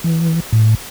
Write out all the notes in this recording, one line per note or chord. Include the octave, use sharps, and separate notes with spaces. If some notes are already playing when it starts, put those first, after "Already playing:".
E3
A2